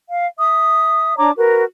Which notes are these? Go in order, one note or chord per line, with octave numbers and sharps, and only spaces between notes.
F5
E5 D#6
D4 C#5 A#5 D6
F#4 A#4 B4